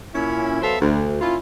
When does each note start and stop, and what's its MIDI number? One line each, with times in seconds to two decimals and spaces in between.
0.15 0.58 46
0.15 0.58 61
0.15 0.58 64
0.62 0.76 54
0.62 0.76 59
0.62 0.76 69
0.62 0.76 72
0.62 0.76 76
0.62 0.76 77
0.81 1.17 38
1.21 1.36 58
1.21 1.36 61
1.21 1.36 64
1.21 1.36 65